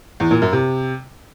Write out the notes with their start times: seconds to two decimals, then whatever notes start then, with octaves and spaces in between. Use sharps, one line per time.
0.20 E2
0.31 A#2
0.42 F#2
0.53 C3